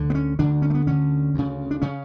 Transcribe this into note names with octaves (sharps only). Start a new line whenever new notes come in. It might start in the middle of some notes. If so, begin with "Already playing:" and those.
Already playing: D2 D3
B3
C#4
D2 D3 D4
C#4
A3
B3
D2 D3 C#4
D2 C#3
D4
C#3 C#4